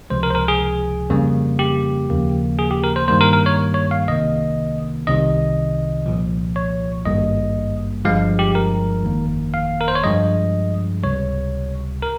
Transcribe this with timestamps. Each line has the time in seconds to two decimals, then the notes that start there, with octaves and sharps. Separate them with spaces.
0.10 C#2 C3 F3 G#3 C5
0.23 A#4
0.30 C5
0.35 A#4
0.48 G#4
1.10 F2 C#3 G3 A#3
1.59 G4
2.09 D#2 C#3 F3 A#3
2.59 G#4
2.71 G4
2.84 A#4
2.96 C5
3.08 G2 D#3 G3 A#3 C5
3.21 A#4
3.33 A#4
3.46 C#5
3.74 C#5
3.91 F5
4.08 C2 C3 D#3 A#3 D#5
5.07 C2 C3 D#3 D#5
6.06 C2 A#2 F3
6.56 C#5
7.06 G#1 G2 G3 A#3 D#5
8.05 G1 G2 F3 G#3 F5
8.39 G4
8.55 A#4
9.04 G1 F2 D#3 A#3
9.54 F5
9.81 A#4
9.88 C5
9.95 C#5
10.04 G2 F3 G#3 D#5
11.03 C#2 C3 G3 C#5
12.02 A#4